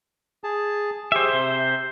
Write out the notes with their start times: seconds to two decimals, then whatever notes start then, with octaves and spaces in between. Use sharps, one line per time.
0.44 G#4 A5
1.12 G4 G#4 C5 E5
1.33 C3